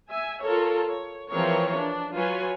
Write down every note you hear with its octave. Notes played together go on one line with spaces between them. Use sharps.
E5 G#5
F4 A4 A#4 C#5
C#5
E3 F3 C4 G#4 A#4 C#5
D4
F#3 F4 B4 C#5 G#5